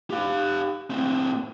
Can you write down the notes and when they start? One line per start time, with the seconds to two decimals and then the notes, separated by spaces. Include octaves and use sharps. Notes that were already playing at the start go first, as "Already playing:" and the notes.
0.11 G4 F5
0.90 A2 C4